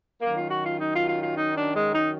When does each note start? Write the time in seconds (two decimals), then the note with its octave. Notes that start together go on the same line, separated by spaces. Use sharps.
0.22 F#2 D#3 F#3 A#3
0.36 F4
0.50 F#4
0.65 F4
0.79 D#4
0.93 F4
1.08 F4
1.22 F4
1.37 D#4
1.56 D4
1.75 G#3
1.95 D#4